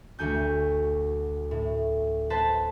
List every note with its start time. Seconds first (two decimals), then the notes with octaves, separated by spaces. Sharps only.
0.19 D2 F#4 G#5 G6
1.51 A2
2.30 B4 C5 A5